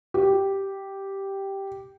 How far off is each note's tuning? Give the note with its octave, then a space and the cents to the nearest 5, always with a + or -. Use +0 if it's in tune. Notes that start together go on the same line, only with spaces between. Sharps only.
G4 -5